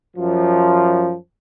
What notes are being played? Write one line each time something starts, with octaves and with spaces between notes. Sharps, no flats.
F#2 F3